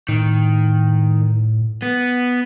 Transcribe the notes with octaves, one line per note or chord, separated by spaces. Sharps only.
A2 D#3
B3